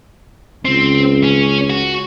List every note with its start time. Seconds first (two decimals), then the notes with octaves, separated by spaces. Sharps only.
0.65 C#2 C4
1.24 C#4
1.70 F#4